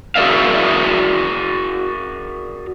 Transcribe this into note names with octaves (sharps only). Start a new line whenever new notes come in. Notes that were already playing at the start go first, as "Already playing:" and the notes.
F#4 G#4 A#4 D5 E5 F5